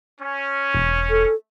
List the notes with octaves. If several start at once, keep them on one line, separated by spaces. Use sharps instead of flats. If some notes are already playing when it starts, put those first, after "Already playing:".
C#4
E1
A4